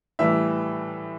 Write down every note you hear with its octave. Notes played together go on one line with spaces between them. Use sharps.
A2 E3 G3 E5